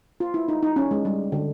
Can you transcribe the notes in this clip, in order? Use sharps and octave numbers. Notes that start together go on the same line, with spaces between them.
F4
E4
D#4
D#4
C#4
G#3
G3
D3